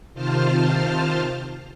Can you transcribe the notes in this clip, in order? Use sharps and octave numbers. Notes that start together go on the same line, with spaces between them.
C3 D#3 F4 C5 A5 F6